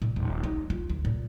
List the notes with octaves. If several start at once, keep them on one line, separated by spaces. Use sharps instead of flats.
A#2
D#1
D#4
F4
D2
A#2